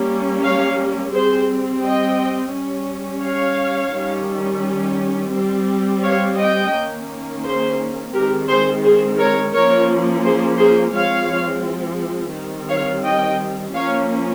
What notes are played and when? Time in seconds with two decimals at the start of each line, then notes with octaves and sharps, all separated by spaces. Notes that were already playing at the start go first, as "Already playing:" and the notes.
Already playing: G3 A#3 C#4
0.42 C#5 F5
1.13 G3 C4 G#4 C5
1.82 D#5 G5
2.53 G3 C#4
3.23 C#5 F5
3.93 D#3 G3 C#4
5.33 G3 C4
6.03 C#5 F5
6.38 D#5 G5
6.73 D#3 A#3 C#4
7.44 G#4 C5
8.13 D#3 G#3 C4 G4 A#4
8.49 G#4 C5
8.84 G#4 C5
9.18 A#4 C#5
9.54 F3 A#3 C#4 A#4 C#5
10.24 G#4 C5
10.58 G#4 C5
10.93 F3 G#3 C4 C#5 F5
12.34 D#3 G3 C4
12.69 C#5 F5
13.04 D#5 G5
13.73 F3 A#3 C#4 C#5 F5